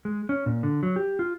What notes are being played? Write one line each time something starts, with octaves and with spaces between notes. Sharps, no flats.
G#3
C#4
A#2
D3
F#3
G4
F4